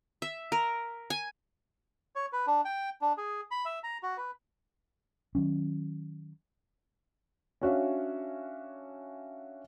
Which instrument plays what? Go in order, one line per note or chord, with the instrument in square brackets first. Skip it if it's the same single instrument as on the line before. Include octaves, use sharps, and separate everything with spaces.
[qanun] E5
A#4
G#5
[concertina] C#5
B4
D4
G5
D4
G#4
B5
E5
A#5
F#4
B4
[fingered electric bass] D#3 F#3 C#4
[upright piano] C#4 D4 F#4 C#5 E5 F5